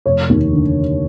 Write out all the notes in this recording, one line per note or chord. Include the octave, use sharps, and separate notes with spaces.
F1 C#5
D#2
D3